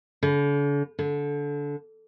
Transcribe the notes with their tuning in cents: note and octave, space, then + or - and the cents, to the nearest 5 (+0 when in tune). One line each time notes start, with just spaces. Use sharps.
D3 -45
D3 -20